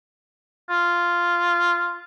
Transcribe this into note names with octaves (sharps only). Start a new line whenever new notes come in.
F4